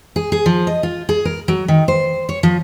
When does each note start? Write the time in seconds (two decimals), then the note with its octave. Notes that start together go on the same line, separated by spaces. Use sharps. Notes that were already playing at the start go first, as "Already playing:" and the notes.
0.16 G#4
0.32 G#4
0.46 F3
0.67 D#5
0.83 F4
1.09 G#4
1.25 A#4
1.48 F#3
1.68 D#3
1.88 C5
2.29 C#5
2.43 F3